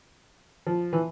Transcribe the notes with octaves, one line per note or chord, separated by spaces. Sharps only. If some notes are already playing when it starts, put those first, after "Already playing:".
F3
E3